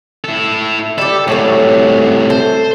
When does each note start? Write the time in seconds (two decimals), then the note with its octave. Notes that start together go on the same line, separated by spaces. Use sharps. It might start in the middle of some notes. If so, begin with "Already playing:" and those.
0.24 E4 A4
0.98 G3 G4 A4
1.28 A2 C3 F#3 C#4 A4
2.30 A4 C5